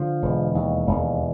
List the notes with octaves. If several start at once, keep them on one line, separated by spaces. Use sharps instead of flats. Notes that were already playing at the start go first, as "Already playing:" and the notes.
Already playing: D3 F3
E1
D#2
E1